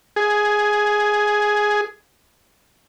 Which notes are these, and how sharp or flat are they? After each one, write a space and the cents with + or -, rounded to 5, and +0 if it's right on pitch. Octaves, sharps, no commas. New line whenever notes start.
G#4 +0 G#5 +15